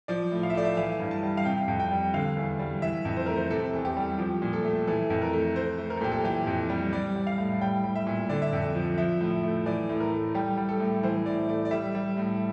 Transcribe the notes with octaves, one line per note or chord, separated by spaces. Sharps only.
F3 D5
A2
F5
E5
A3 D5
E5
E3 F5
G2
A5
G3
F5
C3 G5
F2
G5
G3
D3 F5
E2
G3
E3 E5
F2
C5
A3 A#4
C5
C3 A4
E2
A4
G4
G3
F3 G4
A#2
A4
A3
E3 A4
F2
A#4
A3
A3 C5
A3
A#4
A4
A#2 G4
A4
E3 G4
F2
G3
G3 D5
G3
F5
A2
G3 G5
G3
E5
A#2
D3 D5
E5
F2 D5
F3
F3 E5
A2
A3
E3 D5
A2
A#4
A3
G3 G4
G3
A4
A2
E3 C5
A2 D5
A3 D5
D5
G3 E5
G3
A2